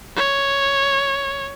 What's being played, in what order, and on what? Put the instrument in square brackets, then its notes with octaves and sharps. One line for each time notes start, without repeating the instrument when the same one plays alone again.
[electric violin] C#5